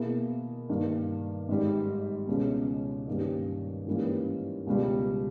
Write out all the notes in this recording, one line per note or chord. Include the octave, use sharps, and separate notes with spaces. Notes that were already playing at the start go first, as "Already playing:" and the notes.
Already playing: B2 A#3 E4 G#4
G2 D#3 A#3
G#1 G#2 G3
C#2 B2 G#3 C#4
G2 D#3 A#3 C#4 G4
G#2 E3 G3 A#3 C#4
C#2 B2 G3